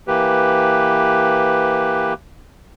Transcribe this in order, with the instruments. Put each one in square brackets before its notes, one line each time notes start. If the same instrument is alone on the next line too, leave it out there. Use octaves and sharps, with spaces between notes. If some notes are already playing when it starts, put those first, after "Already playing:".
[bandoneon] E3 A#3 G4 B4